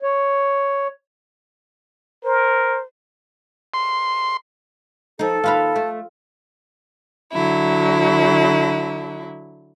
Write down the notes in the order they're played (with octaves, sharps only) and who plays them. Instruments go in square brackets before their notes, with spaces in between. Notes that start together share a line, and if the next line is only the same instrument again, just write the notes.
[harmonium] C#5
[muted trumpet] A#4 [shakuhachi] C5
[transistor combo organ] C6
[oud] F3 D#4 [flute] A4
[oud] D#2 B4 F5 [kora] F4
[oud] A3
[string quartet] D3 F#3 E4